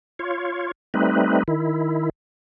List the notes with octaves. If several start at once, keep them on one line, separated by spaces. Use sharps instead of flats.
F4 C#5
G3 A3 C4 D#4 B4
D#3 E4